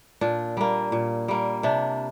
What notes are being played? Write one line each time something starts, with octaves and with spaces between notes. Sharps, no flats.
A#2 D4
G3 A#3
A#2
G3 A#3
C3 D4